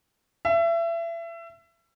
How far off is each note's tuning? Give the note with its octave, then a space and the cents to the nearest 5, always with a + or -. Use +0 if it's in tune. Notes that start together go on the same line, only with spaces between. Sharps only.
E5 +30